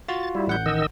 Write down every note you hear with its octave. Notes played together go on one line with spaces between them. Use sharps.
F4 F#4 A6
G3 E4
A1 F#5 G6
D#3 D#5 E6